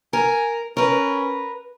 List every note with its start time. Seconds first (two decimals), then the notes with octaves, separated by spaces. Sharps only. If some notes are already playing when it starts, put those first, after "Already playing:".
0.13 A#4 G#5
0.77 C#4 A#4 B4